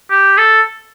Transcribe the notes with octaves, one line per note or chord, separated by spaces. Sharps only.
G4
A4